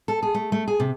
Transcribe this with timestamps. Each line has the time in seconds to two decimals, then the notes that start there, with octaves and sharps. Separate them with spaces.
0.08 A4
0.23 G#4
0.34 A3
0.52 A3
0.68 G#4
0.80 C3